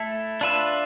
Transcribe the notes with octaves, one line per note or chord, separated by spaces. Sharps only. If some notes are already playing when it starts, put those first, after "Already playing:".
Already playing: A3 E4 A4
D4 F4 B4 E5